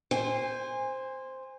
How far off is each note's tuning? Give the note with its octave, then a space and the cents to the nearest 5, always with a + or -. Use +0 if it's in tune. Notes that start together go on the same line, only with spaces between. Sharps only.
C5 +0 G#5 -30